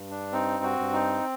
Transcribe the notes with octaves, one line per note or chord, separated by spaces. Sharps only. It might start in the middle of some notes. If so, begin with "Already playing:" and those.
Already playing: G2
D4
C4 D#4
F#4
G2
D#4